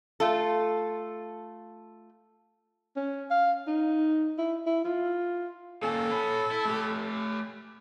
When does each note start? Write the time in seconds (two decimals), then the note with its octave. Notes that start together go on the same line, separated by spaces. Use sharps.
0.20 A3 F4 A4
2.96 C#4
3.30 F5
3.67 D#4
4.38 E4
4.66 E4
4.84 F4
5.83 A#3 C#4 A4
6.11 C#5 B5
6.51 E4
6.65 A3 G4